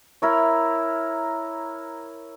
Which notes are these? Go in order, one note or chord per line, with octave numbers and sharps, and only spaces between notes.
E4 A#4 C#5